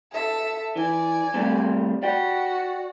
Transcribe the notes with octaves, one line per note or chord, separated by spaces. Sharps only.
A4 E5
E3 D5 G#5
G3 A3 C4
F#4 D5 G5